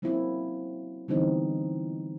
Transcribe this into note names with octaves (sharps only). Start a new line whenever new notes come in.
F#3 A#3 C4 C#4 E4
D3 E3 G3 B3 C4 D#4